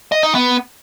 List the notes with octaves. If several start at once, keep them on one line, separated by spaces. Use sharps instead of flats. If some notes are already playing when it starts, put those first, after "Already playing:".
D#5
D#4
B3